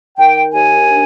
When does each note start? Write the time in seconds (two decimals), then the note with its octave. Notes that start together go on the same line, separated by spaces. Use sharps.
0.18 D#3 G5
0.52 D#2 G#5
0.86 D4